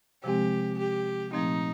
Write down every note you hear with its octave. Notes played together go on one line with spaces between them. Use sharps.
C3 F3 G#3 C4 G4
G4
A#2 F3 A3 C4 D#4